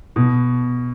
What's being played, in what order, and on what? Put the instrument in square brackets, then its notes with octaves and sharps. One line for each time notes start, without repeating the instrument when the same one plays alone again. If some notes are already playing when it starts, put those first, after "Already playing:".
[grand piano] B2